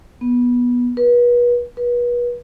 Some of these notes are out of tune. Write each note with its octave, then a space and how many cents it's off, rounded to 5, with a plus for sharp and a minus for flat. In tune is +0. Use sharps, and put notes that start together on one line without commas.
B3 -15
B4 -35
B4 -35